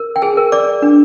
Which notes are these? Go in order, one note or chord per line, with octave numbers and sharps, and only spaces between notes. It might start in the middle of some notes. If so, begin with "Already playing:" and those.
Already playing: A#4
G5
G#4 G#5
A#4
D5 D6
D4